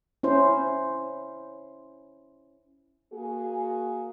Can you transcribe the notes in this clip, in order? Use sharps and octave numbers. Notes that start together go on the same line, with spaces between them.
C#4 E4 C5
A#3 F#4 G#4